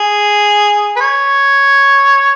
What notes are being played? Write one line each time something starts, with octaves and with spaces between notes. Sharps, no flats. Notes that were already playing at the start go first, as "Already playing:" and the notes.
Already playing: G#4
B4
C#5